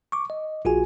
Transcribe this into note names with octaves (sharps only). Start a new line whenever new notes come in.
C#6 D6
D#5
A#1 F4 F#4 G#4 G#5